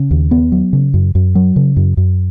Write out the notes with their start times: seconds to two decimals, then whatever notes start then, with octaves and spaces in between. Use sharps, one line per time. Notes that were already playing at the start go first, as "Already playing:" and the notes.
Already playing: C#3
0.11 D#2
0.31 B3
0.52 F#3
0.73 C#3
0.94 F#2
1.15 F#2
1.35 F#3
1.56 C#3
1.76 F#2
1.97 F#2